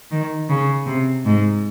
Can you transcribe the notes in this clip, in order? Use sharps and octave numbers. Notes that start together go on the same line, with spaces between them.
D#3
C#3
C3
G#2